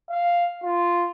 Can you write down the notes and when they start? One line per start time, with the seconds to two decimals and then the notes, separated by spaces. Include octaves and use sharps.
0.10 F5
0.64 F4